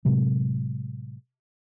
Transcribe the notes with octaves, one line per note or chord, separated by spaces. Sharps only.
A2 C3 F#3 G#3